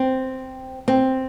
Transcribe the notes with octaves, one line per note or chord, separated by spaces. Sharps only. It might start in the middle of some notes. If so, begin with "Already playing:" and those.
Already playing: C4
C4